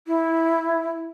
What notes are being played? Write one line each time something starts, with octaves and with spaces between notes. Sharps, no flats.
E4